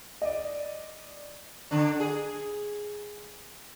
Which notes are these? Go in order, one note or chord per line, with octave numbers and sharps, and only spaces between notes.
D5 D#5
D3 D4
G#4